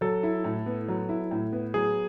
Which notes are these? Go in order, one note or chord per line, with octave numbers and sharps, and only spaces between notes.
F#3 A4
E4
A2
B3
F#3
E4
A2
B3
F#3 G#4